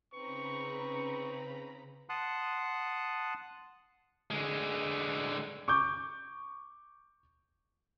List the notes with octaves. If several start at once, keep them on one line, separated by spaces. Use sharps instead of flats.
C#3 C4 D#4 B4 A#5 B5 C#6
F#5 A5 C6 D#6 F#6
D3 G#3
C#6 D6 G6